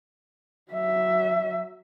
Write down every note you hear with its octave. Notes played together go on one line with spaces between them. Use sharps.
F#3 E5